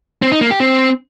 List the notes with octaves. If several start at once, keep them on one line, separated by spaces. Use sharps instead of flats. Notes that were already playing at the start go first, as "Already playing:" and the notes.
C4
D#4
A#3
G4
C4